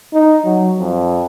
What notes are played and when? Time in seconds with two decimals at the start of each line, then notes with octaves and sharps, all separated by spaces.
0.13 D#4
0.45 F#3
0.79 F2